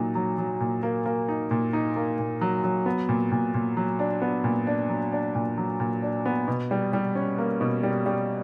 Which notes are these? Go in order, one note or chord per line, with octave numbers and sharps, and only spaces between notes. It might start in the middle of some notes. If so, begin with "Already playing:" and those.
Already playing: A#2 F#3 D#4
F#3
F#3
A#2
A#3
A#3
D#4
A#2
D#4
A#3
A#2
F#3
F#3
B3
A#2
A#2
A#2
F#3
D4
B3
A#2
D4
F#3
D4
A#2
F#3
A#2
D4
B3
B2
G3
G3
C#4
A#3
B2
G3
G3